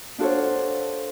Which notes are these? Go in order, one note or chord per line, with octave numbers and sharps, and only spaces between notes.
D4 F4 F#4 A4 C5 C#5